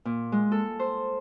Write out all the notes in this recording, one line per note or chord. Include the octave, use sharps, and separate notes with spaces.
A#2
G#3
A4
C5